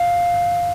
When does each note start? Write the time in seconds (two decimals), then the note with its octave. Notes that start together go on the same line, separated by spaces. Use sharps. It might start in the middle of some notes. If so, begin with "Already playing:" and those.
Already playing: F5